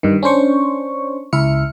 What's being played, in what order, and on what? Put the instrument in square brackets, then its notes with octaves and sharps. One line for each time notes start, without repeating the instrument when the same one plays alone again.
[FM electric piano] G2 D#3
C#4 D4 C5 C#6
C#2 E4 E5 F6 C#7